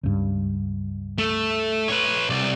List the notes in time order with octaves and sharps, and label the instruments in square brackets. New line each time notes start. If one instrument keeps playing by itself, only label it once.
[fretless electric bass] C#2 G2
[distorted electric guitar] A3
B4 C#5
C2 D5